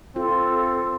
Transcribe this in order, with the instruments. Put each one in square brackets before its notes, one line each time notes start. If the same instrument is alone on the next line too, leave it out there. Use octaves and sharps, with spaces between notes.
[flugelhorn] C4 [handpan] F4 [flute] A4